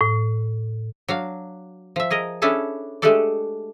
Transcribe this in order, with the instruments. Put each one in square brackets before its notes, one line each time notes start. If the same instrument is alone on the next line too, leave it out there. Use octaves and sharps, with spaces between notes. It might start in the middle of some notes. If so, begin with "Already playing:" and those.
[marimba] A2
[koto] F#3 D4 F5
F3 E5
G#4 A#4 D#5
C#4 D4 E4 G#4 A4 A5
G#3 A3 D4 G4 A4 D5